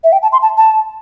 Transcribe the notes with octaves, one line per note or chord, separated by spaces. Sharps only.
E5
G5
A5
C6
A5
A5